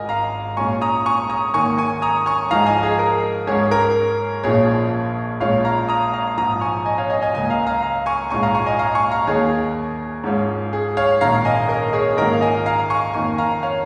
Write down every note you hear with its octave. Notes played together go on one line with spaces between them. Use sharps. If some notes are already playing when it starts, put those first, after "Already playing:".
Already playing: G#1 G#2 G#3 F4 A#4 D#5 G#5
F5 A#5
A#2 G#3 C#4 F4 G#5 C#6
A#5 D#6
G#5 C#6
A#5 D#6
G#2 D#3 A#3 G#5 C#6
G#5 C#6
A#5 D#6
G#5 C#6
G#2 F3 G#3 D#4 F5 A#5
D#5 G#5
G#4
A#4
G#2 G#3 C#4 G#4 C#5
A#4
A#1 A#2 F3 C#4 F4 G#4 C#5
A#1 A#2 G#3 C#4 F4 C#5 F5
F5 A#5
A#5 D#6
F5 A#5
A#1 G#2 F3 A#5 D#6
G#5 C#6
D#5 G#5
C#5 F5
D#5 G#5
D#5 G#5
C#2 C#3 A#3 D#5 G#5
F5 A#5
F5 A#5
F5 A#5
G#5 C#6
A#1 G#2 G#3 C#4 F4 G#5 C#6
F5 A#5
G#5 C#6
D#5 G#5
F5 A#5
G#5 C#6
F5 A#5
D#2 D#3 A#3 D#4 G#4 C#5
G#2 G#3 C#4 F4
G#4
C#5 F5
A#1 G#2 D#3 C#4 F5 A#5
D#5 G#5
A#4 D#5
G#4 C#5
G#2 D#3 A#3 C#4 F4 A#4 D#5
F5
D#5 G#5
F5 A#5
G#5 C#6
F2 D#3 A#3 D#4 G#5 C#6
F5 A#5
C#5 F5